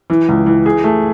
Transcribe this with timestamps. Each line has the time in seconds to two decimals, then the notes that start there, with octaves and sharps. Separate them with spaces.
0.10 E3
0.28 C#2
0.46 E3
0.66 G#4
0.84 A3